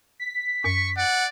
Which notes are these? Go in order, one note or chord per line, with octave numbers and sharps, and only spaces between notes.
B6
F#2 C#6
D5 F#5